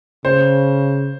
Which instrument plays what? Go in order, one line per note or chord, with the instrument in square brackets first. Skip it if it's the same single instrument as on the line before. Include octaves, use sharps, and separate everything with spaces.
[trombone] C#3 [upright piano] C5